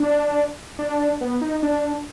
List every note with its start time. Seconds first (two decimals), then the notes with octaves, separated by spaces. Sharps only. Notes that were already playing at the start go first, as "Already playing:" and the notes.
Already playing: D4
0.79 D4
1.21 B3
1.41 D#4
1.63 D4